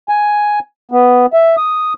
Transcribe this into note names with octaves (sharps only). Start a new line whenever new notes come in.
G#5
B3
E5
D#6